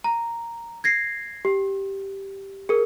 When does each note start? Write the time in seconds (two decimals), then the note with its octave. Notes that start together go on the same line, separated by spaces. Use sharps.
0.04 A#5
0.84 G#6 A#6 C7
1.45 G4
2.69 G#4 A#4